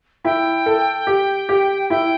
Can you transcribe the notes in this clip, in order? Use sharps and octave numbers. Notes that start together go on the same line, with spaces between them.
E4 G5
A4
G4
G4
E4 G5